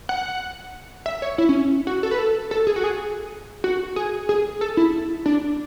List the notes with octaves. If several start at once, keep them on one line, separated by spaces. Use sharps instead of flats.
F#5
E5
C#5
E4
C#4
F#4
A4
B4
A4
A4
G#4
F#4
G#4
F#4
G#4
G#4
A4
E4
D4